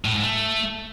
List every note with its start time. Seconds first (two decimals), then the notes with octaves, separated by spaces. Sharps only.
0.05 A2
0.14 G#2
0.23 A3